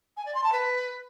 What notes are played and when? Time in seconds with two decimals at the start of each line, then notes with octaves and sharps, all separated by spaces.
0.16 G#5
0.25 D5
0.34 C6
0.43 A5
0.52 B4